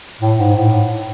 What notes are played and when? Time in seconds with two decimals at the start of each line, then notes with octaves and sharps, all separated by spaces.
0.21 A2
0.39 G#2
0.56 A2